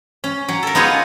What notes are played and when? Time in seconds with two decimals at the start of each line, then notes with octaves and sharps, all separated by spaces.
0.24 C#4
0.48 F#3
0.63 A4 A#4
0.75 B3 D#4 F4 G#4 C#5